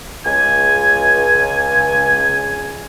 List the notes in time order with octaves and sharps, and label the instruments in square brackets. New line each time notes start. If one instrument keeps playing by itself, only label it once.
[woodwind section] C#2 G#5